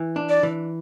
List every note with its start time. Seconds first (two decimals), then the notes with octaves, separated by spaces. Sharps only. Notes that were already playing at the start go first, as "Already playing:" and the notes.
Already playing: E3
0.16 D4
0.29 D5
0.43 E3